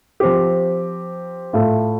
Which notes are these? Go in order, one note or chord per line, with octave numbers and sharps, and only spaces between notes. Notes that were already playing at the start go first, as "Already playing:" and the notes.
F3 C4 G4
A2 A3 F4